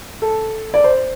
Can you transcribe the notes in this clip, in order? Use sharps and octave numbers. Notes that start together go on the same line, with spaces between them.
A4
D5
C5